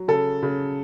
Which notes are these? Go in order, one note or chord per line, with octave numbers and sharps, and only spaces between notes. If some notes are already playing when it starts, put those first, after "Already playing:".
Already playing: F#3
C#3 A4
C#3